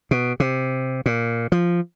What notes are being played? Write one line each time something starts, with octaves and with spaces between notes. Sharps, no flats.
B2
C3
A#2
F3